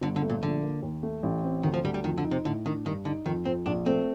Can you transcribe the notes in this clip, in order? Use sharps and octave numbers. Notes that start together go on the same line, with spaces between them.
G1 D3
D3
A3
A#2
A#1 D3
A#3
D#2
A3
A1
C4
D2 D#3
F3
D2 G3
G3
F2 D#3
D3
D#4
C3
A2 D3
D#3 D4
G2 D#3
D3 D#4
F2 D#3
F2 C4
A#1 D4
A3 C4